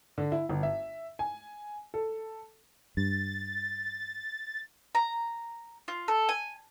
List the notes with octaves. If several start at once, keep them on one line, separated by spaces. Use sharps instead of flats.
D3
E4
G1
E5
G#5
A4
G2 A6
A#5
F4
A4
G#5